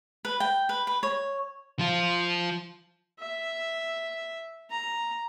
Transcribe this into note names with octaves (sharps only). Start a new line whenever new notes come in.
B4
G5
B4
B4
C#5
F3 F4
E5
A#5